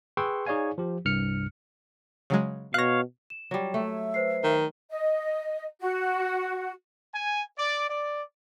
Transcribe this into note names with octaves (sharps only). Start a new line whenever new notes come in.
G#4 B4 G5 C6 C#6 E6
D#4 G#4 C#5 D5 F5 G#5
F3 G4
C2 G2 F6 C#7
C#3 F#3 G#3
B2 C#5 F5 F#6 A#6
E7
F#3 G3
A3 E5
B4 C5 C7
D#3
D#5
F#4
G#5
D5
D5